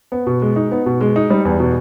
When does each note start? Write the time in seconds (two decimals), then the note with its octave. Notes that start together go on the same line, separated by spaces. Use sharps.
0.12 B3
0.27 B2
0.42 G#3
0.56 D#4
0.71 B3
0.86 B2
1.01 G#3
1.16 D#4
1.30 G3
1.45 E2
1.60 B2